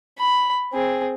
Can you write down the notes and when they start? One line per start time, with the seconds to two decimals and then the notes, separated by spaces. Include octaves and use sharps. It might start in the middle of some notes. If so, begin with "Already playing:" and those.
0.19 B5
0.73 C4 G#4